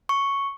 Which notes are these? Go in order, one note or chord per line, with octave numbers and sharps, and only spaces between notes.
C#6